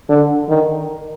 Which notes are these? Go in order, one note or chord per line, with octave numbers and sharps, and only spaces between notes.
D3
D#3